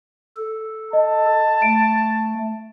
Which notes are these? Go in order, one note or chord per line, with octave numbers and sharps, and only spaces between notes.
A4
D#5 A5
A3 D7